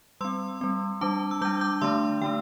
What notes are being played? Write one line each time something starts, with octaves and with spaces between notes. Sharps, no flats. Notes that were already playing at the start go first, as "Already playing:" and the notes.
G3 C4 C6 E6
G3 C4
G3 D4 A5 D6
E6
G3 D4 D6 G6
D6 G6
D3 A3 D4 C6 E6
D3 A3 D4 G5